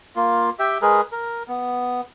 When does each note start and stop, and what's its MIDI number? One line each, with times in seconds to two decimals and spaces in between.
0.16 0.50 58
0.16 0.50 65
0.59 0.78 67
0.59 0.78 76
0.59 0.78 79
0.82 1.01 56
0.82 1.01 68
0.82 1.01 70
0.82 1.01 71
1.12 1.43 70
1.48 2.01 59